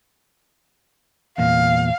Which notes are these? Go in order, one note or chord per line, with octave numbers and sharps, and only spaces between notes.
E2 A#2 F5